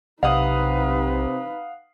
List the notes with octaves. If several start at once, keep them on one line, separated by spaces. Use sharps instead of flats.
B1 C3 D#4 B4 F5 F#5 D#6